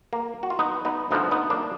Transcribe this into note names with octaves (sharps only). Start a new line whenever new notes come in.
A#3
F#4
F4
B3 D#4
B3 D#4
D2 D3 F3 B3 D#4
B3 D#4
A#3 D4